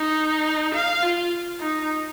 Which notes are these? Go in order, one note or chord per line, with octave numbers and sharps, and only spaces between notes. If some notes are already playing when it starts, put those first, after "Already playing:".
Already playing: D#4
F5
F4
D#4